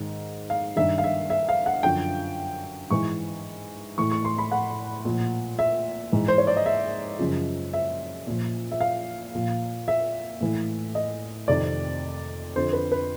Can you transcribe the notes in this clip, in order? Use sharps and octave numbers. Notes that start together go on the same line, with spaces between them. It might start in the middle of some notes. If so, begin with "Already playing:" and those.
Already playing: G#2 D#3
F5
G2 D#3 E5
F5
E5
E5
F5
F#5
F#2 D3 F3 G5
G#2 E3 C#6
A2 E3 C#6
C#6
C6
B5
F#5
A#2 F3
E5
G#2 E3
C5
C#5
D5
D#5
E5
F#2 C#3 F3
E5
A#2 F3
E5
F5
A#2 F3
E5
A2 E3
D#5
F2 C3 D#3 D5
F2 D3 F3 C5
B4
B4